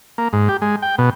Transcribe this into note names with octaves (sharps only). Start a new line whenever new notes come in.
A#3
G#2
G4
G#3
G5
B2